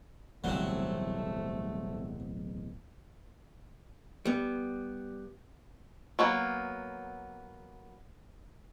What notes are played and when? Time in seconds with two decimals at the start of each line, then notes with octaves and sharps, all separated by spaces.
0.44 D1 B1 C3 E3 F#3 G3 A3
4.25 G3 B3
6.19 F#3 A#3 B3